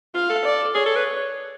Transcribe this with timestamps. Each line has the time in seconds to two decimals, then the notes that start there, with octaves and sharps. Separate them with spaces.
0.14 F4 F5
0.29 A4
0.44 D5
0.75 G#4 C#5
0.86 A4
0.96 B4